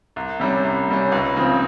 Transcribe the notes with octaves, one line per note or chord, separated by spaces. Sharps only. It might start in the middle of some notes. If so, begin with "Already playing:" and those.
C2
C3 G3 C#4
C2
C3 G3 C#4
C#2
C#3 F3 C4